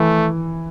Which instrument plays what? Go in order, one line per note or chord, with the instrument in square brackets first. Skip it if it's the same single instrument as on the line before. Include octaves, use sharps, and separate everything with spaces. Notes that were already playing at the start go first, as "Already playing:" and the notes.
Already playing: [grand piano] E3 [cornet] A3